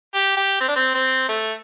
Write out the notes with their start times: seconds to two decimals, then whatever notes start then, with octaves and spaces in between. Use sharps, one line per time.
0.15 G4
0.37 G4
0.60 C4
0.69 D4
0.76 C4
0.95 C4
1.29 A3